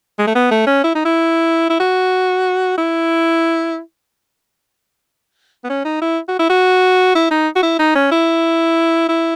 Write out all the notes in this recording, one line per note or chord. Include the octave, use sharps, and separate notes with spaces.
G#3
A3
B3
A3
C#4
E4
D#4
E4
E4
F#4
E4
B3
C#4
D#4
E4
F#4
E4
F#4
E4
D#4
F#4
E4
D#4
C#4
E4
E4